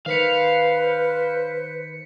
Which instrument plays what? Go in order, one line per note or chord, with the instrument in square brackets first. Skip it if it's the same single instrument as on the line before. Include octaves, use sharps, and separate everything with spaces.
[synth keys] D#3 B6 C#7 [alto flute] B4 [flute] C5 [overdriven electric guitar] F5